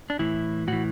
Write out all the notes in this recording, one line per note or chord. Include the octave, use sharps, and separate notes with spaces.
D4
A2 E3 E4
A2 E3 F#4